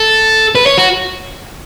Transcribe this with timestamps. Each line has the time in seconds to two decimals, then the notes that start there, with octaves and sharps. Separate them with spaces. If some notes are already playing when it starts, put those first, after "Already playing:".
Already playing: A4
0.55 B4
0.66 C#5
0.77 F#4